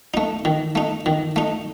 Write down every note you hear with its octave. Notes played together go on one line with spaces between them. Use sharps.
A3 D#4
D#3
A3 D#4
D#3
A3 D#4